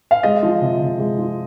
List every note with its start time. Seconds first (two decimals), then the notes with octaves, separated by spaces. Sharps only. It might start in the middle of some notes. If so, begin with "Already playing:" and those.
0.11 F5
0.23 G#3 D#5
0.43 F3
0.61 C3
0.80 C3
0.99 G#3
1.18 F3